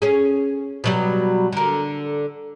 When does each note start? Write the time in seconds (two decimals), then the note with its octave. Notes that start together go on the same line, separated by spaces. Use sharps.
0.02 C#4 G#4
0.84 B2 F#3 G3
1.53 D3 A#4